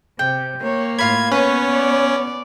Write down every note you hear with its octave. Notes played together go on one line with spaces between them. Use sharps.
C3 G5
A#3 C#5
A2 F4 F5 B5 G#6
B3 C#4 B4 C#5
D5